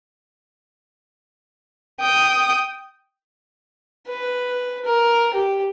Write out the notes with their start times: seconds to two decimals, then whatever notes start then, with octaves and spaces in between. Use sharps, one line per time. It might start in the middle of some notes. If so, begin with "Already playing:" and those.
2.01 G5 D#6
4.08 B4
4.85 A#4
5.35 G4